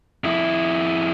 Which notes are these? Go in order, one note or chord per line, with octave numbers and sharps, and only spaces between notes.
F2 E4